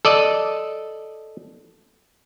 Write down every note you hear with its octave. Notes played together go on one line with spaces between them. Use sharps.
A4 D5 D#5